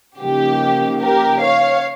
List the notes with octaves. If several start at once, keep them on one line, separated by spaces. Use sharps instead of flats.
C#3 F3 A#3 D#4 G4
G4 A#4
C#5 F5